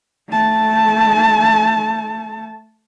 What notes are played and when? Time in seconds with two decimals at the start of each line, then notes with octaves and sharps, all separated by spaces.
0.29 A3 A5